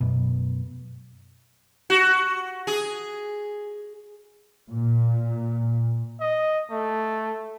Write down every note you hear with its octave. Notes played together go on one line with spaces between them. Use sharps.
F#2 B2
F#4
G#4
A#2
D#5
A3